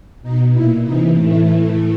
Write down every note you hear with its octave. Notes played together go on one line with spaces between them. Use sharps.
B2 D#4
A#2 E4
C3 E3 D#4
A2 E3 A3